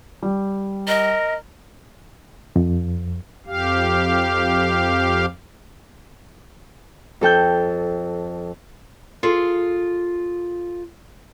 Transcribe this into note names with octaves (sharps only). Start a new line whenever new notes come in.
G3
A#4 D#5
F2
F2 G4 F5
F2 A4 G5 G6
F4 G#4 A4